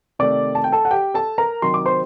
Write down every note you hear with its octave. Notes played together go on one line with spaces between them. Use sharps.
C3 D#3 A3 D5 D6
A5
G5
A4 A5
F#5
G4 G5
A4 A5
A#4 A#5
C3 D#3 F#3 C6
D6
C5 C6